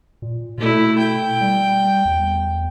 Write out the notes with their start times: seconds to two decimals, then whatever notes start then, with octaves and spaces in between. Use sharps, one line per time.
0.22 A#2
0.58 B2 A3 E4
0.98 G5
1.41 G3
2.05 E2